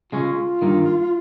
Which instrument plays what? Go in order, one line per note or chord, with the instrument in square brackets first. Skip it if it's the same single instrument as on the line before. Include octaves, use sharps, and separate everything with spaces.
[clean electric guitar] C#3 G#3 C#4 [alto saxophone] F4
[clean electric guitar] G2 D#3 A#3